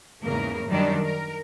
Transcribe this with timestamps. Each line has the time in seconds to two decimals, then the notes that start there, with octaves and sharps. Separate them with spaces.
0.23 E2 G#2 C#3 A#3 A#4
0.68 F#2 D#3 G3 D4 A#4 D5
1.04 A#4